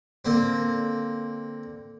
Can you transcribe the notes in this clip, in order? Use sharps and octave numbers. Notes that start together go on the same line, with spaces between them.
D3 A#3 C4